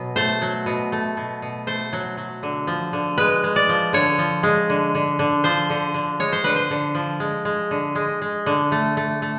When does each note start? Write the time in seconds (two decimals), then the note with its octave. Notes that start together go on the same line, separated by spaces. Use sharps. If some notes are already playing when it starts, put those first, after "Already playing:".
Already playing: B2 F#3
0.16 A3 C5
0.42 F#3
0.66 B2
0.92 A3
1.17 B2
1.42 B2
1.67 A3 C5
1.93 F#3
2.17 F#3
2.43 D3
2.67 F3
2.93 D3
3.18 G#3 B4
3.44 G#3
3.56 D5
3.69 F3
3.93 D3 C#5
4.18 F3
4.43 G#3
4.70 D3
4.95 D3
5.19 D3
5.44 F3 C5
5.70 D3
5.94 D3
6.20 G#3 C#5
6.32 C5
6.44 D3 B4
6.56 C5
6.71 D3
6.95 F3
7.20 G#3
7.45 G#3
7.71 D3
7.95 G#3
8.22 G#3
8.46 D3
8.72 A3
8.97 A3
9.22 A3